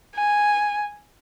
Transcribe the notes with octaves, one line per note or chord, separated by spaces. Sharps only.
G#5